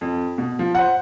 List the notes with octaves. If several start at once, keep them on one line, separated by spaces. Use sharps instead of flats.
F2
B2
F3
C5 F#5